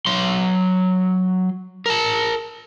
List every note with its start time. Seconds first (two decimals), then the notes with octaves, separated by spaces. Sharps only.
0.06 F#3 C6
1.86 A#4 A5